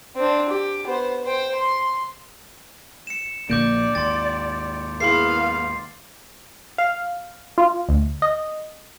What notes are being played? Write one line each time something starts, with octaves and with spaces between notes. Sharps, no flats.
C4 D4
G4
B3 C5
C5 G5
C6
C#7 E7
A#1 A#2 D3 A#3 D5 D6 G6 D7
D#2 G#2 G5 C6 A6
B3 E4 G#4 A#4 F5 C6 C7
F5
F4
D2
D#5